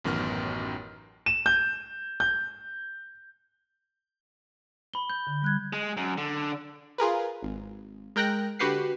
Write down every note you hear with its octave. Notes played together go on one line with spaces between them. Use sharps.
A1 F#2 D#3 B3 F6
E7
G6
G6
B5 G7
G6
D3
G3 F#6 G#6
G#3
F#2
D3
F4 G#4 A#4 B4
G#1
G#3 A#4 G5 F#6 A#6
D3 F#4 G4 B4 F#5 C7